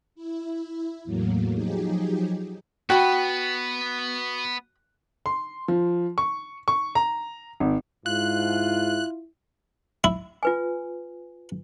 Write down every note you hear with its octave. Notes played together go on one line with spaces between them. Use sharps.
E4
E2 A2 F#3 A#3
F3 F#3 D#4 G4 G#4
B3 F#4 G5 B5
C6
F3
C#6
C#6
A#5
G#1
G#2 E4 F4 F#6
E4
F4 B4 G#5